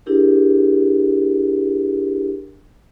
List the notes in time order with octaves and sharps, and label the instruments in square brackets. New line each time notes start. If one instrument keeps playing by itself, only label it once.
[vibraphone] D4 E4 G4 G#4 A#4